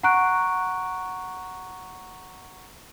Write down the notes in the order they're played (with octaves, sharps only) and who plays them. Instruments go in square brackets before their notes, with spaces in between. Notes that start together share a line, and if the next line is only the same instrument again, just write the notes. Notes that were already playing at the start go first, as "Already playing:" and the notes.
[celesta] F#5 A#5 C#6 F#6 D7